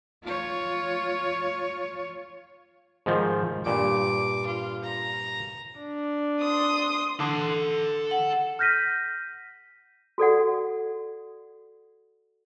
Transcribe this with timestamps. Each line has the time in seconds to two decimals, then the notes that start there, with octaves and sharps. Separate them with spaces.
0.24 F4 C#5
3.06 G#2 D#3 F3
3.66 G2 A#2 D6
4.46 F4
4.84 A#5
5.80 D4
6.41 C6 D#6
7.20 D3 A4 C6
8.11 F#5
8.59 F6 G6 A#6 B6 D#7
10.18 F#4 A4 D5 F#5